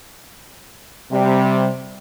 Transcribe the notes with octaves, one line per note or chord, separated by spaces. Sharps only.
C3 G3